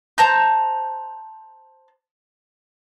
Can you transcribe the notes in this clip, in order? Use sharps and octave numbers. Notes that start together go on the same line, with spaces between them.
C5 A5 A#5 G6